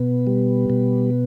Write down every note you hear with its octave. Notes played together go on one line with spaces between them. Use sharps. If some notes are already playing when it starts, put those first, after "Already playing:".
Already playing: B2 B3
G3
B2